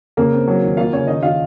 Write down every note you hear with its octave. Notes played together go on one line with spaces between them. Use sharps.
C#3 A#3 A#4
C4
F#3
D#3
A#3 F4 F5
C#3 C#4 C#5
D#3 D#4 D#5
D#3 F4 F5